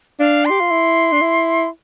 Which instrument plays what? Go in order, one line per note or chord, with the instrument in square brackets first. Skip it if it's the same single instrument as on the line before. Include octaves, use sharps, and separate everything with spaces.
[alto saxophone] D4 [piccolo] F5
[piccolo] C6
[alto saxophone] G4
F4
E4
D4
E4